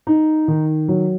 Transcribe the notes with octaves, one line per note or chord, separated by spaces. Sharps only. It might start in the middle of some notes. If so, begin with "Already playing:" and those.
D#4
D#3
F#3